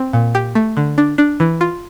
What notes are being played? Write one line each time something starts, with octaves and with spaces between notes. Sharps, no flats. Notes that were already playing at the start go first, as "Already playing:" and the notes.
Already playing: C4
A#2
G4
A3
D3
D4
D4
E3
F4